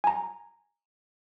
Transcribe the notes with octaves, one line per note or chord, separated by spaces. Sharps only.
G#5 A#5